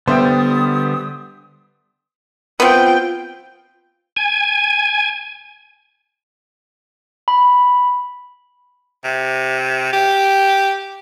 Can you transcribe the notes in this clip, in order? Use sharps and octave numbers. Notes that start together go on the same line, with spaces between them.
D3 G3 B3 C5 E5 G5 D#6
B3 C4 F4 G5
G#5
B5
C3
G4